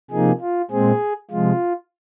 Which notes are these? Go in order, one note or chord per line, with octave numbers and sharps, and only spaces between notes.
C3 F3 A#3 D#4 G#4
F4
A#2 G#3 C4 G#4
C3 F3 G#3 F4